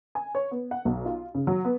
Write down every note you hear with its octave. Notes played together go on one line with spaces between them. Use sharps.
G#5
C#5
B3
F#5
B1
F4
C#3
F#3
B3